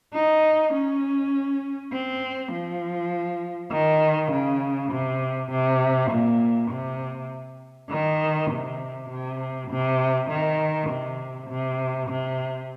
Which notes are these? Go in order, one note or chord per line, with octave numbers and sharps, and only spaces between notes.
D#4
C#4
C4
F3
D#3
C#3
C3
C3
A#2
C3
D#3
C3
C3
C3
D#3
C3
C3
C3